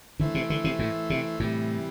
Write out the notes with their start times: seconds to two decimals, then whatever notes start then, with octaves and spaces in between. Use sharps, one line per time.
0.20 D3 E3 A3 E4 C5
0.35 C3
0.50 D3
0.64 C3
0.79 A2
1.10 C3
1.39 A2 C3 E3 G3